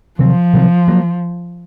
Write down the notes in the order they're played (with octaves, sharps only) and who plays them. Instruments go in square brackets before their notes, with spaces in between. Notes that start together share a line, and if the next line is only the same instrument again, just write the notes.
[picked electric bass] C3 D#3 F#3 C4 [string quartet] F3
[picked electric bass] C3 D#3 F#3 C4
F#3 A#3